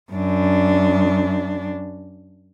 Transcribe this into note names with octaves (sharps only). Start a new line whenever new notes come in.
F#2 D4